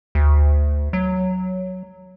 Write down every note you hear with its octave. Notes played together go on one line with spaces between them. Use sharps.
D2
F#3